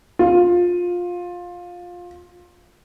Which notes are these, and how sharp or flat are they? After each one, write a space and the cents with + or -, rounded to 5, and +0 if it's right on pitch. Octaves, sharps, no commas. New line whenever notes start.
F4 +15